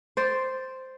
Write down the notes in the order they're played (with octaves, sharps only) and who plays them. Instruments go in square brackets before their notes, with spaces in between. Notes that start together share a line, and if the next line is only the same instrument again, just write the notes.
[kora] C5 D5